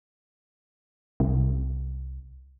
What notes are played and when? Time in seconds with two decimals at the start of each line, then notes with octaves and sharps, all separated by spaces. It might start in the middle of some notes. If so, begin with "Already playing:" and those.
1.20 C2